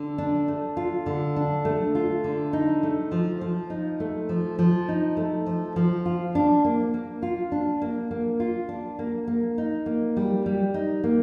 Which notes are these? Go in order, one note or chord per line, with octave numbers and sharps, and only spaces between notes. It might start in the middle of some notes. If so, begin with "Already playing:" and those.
Already playing: D3
D4
A3
F4
D3
D4
A3
F4
D3
D#4
A3
F3
F3
D#4
A3
F3
F3
D#4
A3
F3
F3
F4
D4
A#3
A#3
F4
D4
A#3
A#3
F4
D4
A#3
A#3
D#4
A#3
G3
G3
D#4
A#3